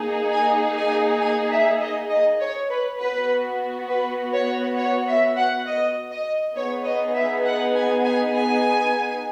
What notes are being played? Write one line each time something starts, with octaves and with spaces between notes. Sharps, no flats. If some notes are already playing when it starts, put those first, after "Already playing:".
Already playing: A#3 D#4 G#4
G#5
G#5
G#5
E5
D#5
D#5
C#5
B4
B3 F#4 B4
B4
C#5
C#5
E5
F#5
D#5
D#5
B3 D#4 G#4 C#5
D#5
E5
F#5
G#5
G#5
G#5